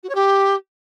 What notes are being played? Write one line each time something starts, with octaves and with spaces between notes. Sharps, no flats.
F#4
C#5
G4